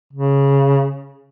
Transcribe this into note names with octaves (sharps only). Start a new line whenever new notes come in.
C#3